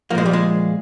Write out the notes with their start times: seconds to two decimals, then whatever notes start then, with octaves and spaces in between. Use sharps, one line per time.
0.10 F3 A#3
0.15 A#2 G#3
0.26 G3
0.33 G#3